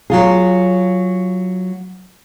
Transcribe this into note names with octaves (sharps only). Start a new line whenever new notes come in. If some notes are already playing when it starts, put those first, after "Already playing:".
F#3 F4 G#4